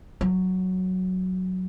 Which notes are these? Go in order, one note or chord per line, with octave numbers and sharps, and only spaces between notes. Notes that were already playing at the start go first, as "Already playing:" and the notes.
F#3